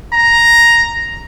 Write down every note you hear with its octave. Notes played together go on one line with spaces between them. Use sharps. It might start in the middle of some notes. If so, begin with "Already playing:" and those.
A#5